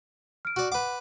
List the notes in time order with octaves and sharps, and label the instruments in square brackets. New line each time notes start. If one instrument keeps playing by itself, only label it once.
[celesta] F6 D7
[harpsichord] F#4 D5
[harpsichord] B4 D6 [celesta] F#5